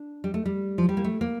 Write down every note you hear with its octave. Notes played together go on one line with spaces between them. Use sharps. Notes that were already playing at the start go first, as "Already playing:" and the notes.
Already playing: D4
G3
A3
G3
F3
G3
A#3
A3
A#3